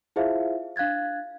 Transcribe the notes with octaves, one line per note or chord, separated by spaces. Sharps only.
E4 F4 G#4 C5 E5 F5
D4 F5 F#6 G#6 A6